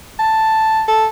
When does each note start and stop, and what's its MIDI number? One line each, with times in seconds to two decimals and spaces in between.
0.19 0.82 81
0.88 1.06 69